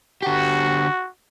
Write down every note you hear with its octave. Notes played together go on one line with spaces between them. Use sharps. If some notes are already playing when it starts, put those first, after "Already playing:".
D3 F#4 G4